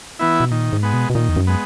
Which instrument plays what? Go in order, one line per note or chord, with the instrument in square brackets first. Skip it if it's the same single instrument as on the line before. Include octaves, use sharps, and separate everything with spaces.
[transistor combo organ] E3 B3 E4
[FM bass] B2
[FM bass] A#2 [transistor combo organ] D#3
[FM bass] G#2
[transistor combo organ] G#3 B3
[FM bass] B2
B2
[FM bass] A#2 [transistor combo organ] D#3
[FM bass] E2
F#2
[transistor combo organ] G#3 B3